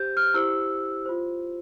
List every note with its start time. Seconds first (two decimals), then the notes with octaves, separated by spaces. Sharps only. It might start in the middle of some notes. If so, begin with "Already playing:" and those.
Already playing: G4 C5 G6
0.17 F6
0.34 E4 G4 C5 E6
1.06 F4 C5